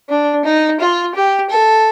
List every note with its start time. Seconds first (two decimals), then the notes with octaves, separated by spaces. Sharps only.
0.09 D4
0.45 D#4
0.80 F4
1.15 G4
1.50 A4